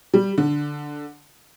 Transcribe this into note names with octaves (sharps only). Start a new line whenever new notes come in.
G3
D3